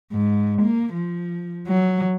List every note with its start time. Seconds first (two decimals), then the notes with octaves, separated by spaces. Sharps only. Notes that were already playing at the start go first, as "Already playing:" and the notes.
0.12 G#2
0.62 A#3
0.93 F3
1.67 F#3